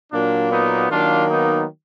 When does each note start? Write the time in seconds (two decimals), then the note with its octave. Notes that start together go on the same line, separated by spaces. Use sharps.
0.11 A#2 F#3 A#3 D4
0.50 B3 D#4
0.89 D#3 F#3 A#3 D4 F4
1.29 B3 D#4